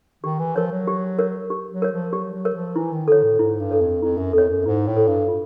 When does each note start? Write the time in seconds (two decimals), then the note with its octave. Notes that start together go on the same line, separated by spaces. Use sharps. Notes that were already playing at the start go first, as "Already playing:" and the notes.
0.24 D#3 G4
0.39 E3
0.56 F3 A#4 C#5
0.72 F#3
0.88 G4
1.19 A#4 C#5
1.50 G4
1.71 F#3
1.82 A#4 C#5
1.92 F3
2.13 F#3 G4
2.33 F#3
2.45 A#4 C#5
2.55 F3
2.76 E3 E4
2.92 D#3
3.08 D3 A4 C#5
3.23 A2
3.39 G#2 E4
3.60 G2
3.71 A4 C#5
3.81 F2
4.03 F2 E4
4.17 F#2
4.33 F2 A4 C#5
4.49 F#2
4.66 G#2 E4
4.87 A2
4.97 A4 C#5
5.07 G2
5.28 F4